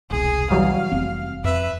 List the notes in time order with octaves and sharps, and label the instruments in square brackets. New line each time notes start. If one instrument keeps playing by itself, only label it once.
[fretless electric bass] E1 C2 [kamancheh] G#4
[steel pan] E3 F#3 G3 [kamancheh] F5
[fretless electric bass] F1 C4
[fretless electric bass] F2 [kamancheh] B4 E5